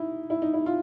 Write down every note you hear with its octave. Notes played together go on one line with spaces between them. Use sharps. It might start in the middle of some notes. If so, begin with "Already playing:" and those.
Already playing: D#4 E4
E4
D#4
E4
F4